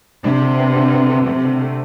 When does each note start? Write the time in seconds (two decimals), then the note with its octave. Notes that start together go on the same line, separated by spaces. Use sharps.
0.24 C3 D4
0.41 D3
0.59 B3
0.75 D3
0.92 B3
1.10 D3
1.27 C3 A3
1.44 D3
1.60 A3